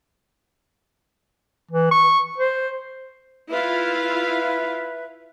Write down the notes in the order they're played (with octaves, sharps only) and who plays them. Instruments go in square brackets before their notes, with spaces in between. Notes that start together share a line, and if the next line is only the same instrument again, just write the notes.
[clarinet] E3
C#6
C5
[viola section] E4 F4 F5 [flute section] B4 E5